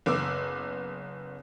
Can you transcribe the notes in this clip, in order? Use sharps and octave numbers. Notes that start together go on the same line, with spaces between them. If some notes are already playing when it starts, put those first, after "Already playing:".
F#1 B3 D6 E6